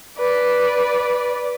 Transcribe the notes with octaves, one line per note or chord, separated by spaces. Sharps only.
B4 D5